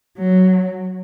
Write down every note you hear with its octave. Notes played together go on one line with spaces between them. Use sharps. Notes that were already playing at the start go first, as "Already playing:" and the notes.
F#3